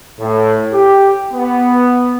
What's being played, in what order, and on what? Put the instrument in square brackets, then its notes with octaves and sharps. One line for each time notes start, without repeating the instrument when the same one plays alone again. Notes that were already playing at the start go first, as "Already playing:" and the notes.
[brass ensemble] A2
G4
B3